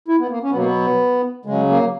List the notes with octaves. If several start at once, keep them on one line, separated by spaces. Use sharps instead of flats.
E4
B3
A#3
C#4
B3
B2 F#3 A#3
B3
C#3 F#3 G#3
A#3